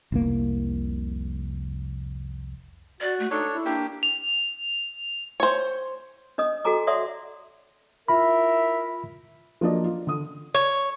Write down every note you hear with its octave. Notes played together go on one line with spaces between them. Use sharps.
F1 C2 A#3
F#4 D5
A3
D4 D#4 A4 C#5
E4
A#3 D4 G4
F7
C5 C#5
D4 D#5 D#6
F#4 A4 G#5 A#5 D6
C#5 D5 E5 F#5 C6 D#6
E4 F4 A#4 E5 B5
F3 F#3 A#3 D4 D5 D#5
F4
D3 D#6
C#5